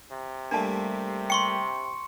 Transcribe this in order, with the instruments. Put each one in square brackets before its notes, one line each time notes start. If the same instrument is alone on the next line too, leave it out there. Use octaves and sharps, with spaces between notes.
[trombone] C3
[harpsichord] G3 A3 A#3 [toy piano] D4 A5
[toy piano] G5 [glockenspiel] C6 C#6 C#7